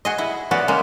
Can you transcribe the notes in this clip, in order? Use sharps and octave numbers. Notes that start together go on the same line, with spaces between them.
F#4 G#4 D#5
E4
B3 C#4 F#4 B4 D5
C#3 G#3 A#3